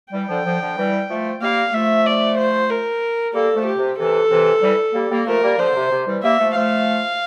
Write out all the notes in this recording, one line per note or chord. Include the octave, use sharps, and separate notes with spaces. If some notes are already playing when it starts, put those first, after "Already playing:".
E3 G3 G5
D3 F3
D3 F3
D3 F3
E3 G3
F3 A3
G3 A#3 F5
F3 A3 E5
D5
C5
A#4
G3 A#3 A4
F3 A3
G4
C3
C3 E3 A4
C3 E3
E3 G3
G3 A#3
G3 A#3
F3 A3 A#4
G3 A#3
D3 F3 C5
C3
C3
E3 G3
G3 A#3 E5
F3 A3
F3 A3 F5